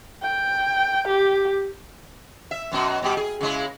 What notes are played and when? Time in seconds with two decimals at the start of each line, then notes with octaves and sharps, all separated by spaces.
0.22 G5
1.07 G4
2.51 E5
2.72 F#2 B2 F#4
3.02 B2 G3 G4
3.17 G#4
3.41 C#3 G#3 E4